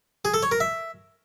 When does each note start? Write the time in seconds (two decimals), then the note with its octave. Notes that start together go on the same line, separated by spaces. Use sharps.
0.25 G#4
0.34 A4
0.43 C#5
0.52 A#4
0.60 E5